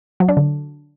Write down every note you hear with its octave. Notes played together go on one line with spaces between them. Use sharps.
F#3
D4
D3